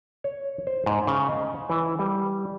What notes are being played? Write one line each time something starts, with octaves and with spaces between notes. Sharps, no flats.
C#5
C5
G#2
C#3
D#5
E3
G3